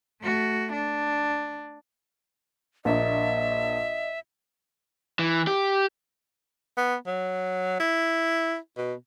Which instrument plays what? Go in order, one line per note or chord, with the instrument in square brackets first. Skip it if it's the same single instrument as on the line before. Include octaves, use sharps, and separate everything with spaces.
[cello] A3 F#4
D4
[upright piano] A#1 A#3 D4 [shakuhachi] D#5 [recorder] E5
[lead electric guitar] E3
G4
[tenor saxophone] B3
F#3
E4
B2